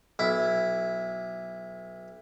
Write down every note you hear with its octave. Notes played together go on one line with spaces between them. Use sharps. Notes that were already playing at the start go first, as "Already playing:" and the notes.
B1 E4